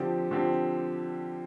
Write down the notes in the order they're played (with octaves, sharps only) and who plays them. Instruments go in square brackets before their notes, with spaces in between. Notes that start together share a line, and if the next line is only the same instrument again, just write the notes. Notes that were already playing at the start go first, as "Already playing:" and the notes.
Already playing: [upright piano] D3 F3 C4 G4
D3 F3 C4 G4